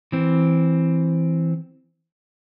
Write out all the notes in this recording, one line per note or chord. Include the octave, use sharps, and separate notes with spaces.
E3 C4